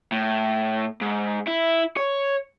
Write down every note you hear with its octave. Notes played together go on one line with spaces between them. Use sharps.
A2
G#2
E4
C#5